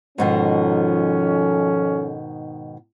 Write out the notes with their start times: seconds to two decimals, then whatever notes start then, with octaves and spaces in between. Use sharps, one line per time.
0.18 G#2 B2 D#3 F3 C#4 A4